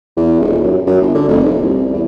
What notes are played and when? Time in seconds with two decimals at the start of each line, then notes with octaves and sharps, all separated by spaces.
0.17 E2
0.40 D#1
0.64 F#2
0.87 F#2
1.02 G1
1.14 D3
1.28 F1
1.43 D#1
1.62 C2
1.93 E2